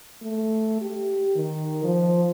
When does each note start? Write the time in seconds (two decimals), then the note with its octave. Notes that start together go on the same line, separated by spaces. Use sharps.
0.22 A3
0.81 G4
1.36 D#3
1.84 F3